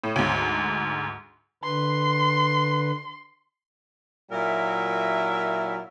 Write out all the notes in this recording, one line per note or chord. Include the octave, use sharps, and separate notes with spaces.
A2
D2 G#2
D3 B4 C6
A#2 F#3 E4 A#4 E5